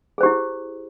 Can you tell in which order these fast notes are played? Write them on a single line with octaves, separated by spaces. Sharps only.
G#4 C5 G4 E4